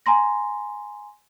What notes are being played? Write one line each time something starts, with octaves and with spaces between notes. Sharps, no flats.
G#5 A#5 C6 A#6